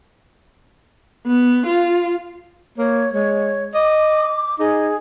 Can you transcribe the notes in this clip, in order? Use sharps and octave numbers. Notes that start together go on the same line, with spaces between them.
B3
F4
A#3 C#5
G#3 C#5
D#5 D6
D#4 G#4